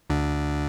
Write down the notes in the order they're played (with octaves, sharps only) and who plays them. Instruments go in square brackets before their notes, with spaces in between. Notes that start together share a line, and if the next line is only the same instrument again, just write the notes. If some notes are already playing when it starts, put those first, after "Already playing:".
[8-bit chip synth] D2 D3